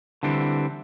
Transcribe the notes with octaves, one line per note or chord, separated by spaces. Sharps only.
D3 E3 G3 C4